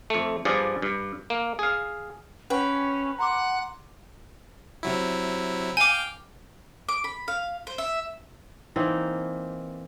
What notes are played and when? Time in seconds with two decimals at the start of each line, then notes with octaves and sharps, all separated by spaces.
0.10 F2 A3
0.45 G2 F3 G#4 D5
0.82 G2
1.30 A#3
1.59 G#4 F5
2.50 C#4 B4 F#5 G5
3.19 F#5 A#5 C6 D6
4.83 C3 F#3 E4
5.77 F5 G5 G#5 D6
6.89 D6
7.04 B5
7.28 F5
7.67 C5
7.78 E5
8.76 E3 A#3 C4 D#4